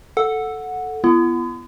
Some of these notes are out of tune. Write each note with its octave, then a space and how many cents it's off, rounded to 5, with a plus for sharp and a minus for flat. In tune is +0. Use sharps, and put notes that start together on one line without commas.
A4 +0 F#5 -10
B3 +0 E4 +45